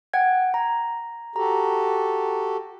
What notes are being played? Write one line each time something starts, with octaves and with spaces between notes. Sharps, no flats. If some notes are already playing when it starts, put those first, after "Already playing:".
F#5 G5 G#6
A#5
F#4 G4 A4 A#5